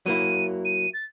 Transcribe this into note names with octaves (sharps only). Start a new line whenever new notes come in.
F#3 A#3 E4 D#7
D#7
A6